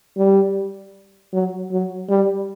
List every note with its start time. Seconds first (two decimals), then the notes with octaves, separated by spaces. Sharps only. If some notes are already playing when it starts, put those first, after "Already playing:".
0.17 G3
1.33 F#3
1.72 F#3
2.09 G3